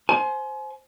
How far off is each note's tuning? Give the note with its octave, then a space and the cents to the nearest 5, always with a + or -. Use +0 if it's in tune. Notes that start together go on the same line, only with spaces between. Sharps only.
C5 +0 G#5 +35